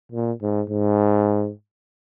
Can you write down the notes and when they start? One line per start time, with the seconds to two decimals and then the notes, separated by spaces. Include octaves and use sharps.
0.12 A#2
0.42 G#2
0.70 G#2